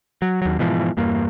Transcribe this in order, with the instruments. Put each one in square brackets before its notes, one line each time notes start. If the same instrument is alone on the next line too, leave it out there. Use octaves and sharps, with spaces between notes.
[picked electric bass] F#3
D#2 F#3
G#2 B2 E3 F3
E2 G2 A#3